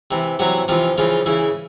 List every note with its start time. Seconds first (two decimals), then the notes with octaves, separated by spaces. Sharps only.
0.11 C3 E3
0.39 C3 E3 F#3 F#4
0.68 C3 E3 F3 F4
0.98 C#3 E3 F3 F4
1.26 C#3 E3 E4